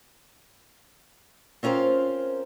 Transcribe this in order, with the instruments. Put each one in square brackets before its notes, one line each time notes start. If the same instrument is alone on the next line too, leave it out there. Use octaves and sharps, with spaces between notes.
[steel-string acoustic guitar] C4 C#4 F4 A#4 C5